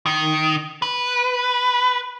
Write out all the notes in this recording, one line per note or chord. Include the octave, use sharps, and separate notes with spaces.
D#3
B4